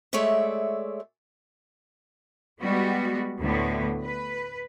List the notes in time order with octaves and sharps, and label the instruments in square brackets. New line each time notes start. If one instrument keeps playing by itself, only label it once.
[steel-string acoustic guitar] G#3 A3 C#5 D5 E5
[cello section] G3 G#3 B3 F#4
D2 A2 D3 B3
B4